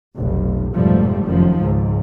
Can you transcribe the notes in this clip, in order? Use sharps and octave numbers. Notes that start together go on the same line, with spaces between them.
F1 B1
F1 G#2 B2 F3 G3 A3
F1 F#2 D#3 F3
C#2 G#2